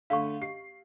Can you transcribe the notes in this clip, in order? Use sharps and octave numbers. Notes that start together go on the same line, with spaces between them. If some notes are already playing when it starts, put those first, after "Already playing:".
D3 A3 F5 C#6
G4 C7